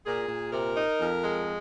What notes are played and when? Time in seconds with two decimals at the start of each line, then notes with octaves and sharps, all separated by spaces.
0.06 A#2 G#4
0.29 A#2
0.52 C3 A#4
0.77 D#4
1.00 F2
1.23 G#3